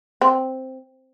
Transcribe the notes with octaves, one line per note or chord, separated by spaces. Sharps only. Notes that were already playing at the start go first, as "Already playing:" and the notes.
C4